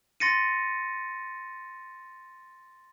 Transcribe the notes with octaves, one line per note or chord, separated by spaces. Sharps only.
C6 A6 A#6 C#7 D#7